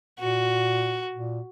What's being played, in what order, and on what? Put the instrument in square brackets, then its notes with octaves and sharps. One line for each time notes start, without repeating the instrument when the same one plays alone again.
[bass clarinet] A#2 [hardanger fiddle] F#4
[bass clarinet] A#2